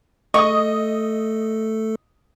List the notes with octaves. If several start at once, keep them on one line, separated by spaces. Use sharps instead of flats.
A3 A4 D#5 C#6 D#6